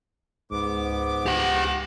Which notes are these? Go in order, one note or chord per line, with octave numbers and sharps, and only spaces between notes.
C#2 G#2 B3 D6
C#2 G4 F#5